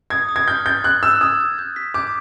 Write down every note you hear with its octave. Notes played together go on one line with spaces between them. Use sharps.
D#6 G#6
D#6
G#6
F6 G6
G6 A6
F#6 G6
E6 G6
D#6 G#6
G#6
G6
B6
D6 G6